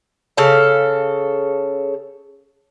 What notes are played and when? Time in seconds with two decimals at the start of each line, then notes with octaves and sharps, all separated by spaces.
0.37 C#3 A4 F5